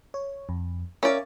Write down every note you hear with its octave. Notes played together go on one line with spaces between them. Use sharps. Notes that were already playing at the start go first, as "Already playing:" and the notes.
C#5
F2
C#4 A#4 D5 E5 F5